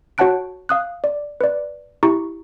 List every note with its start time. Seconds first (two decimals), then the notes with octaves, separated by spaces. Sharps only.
0.18 F#4 C#5 F#5 A5 F#6 D7
0.69 F5 D#6 F#6
1.04 D5
1.41 B4 D5
2.03 E4 G4 A#5 C#6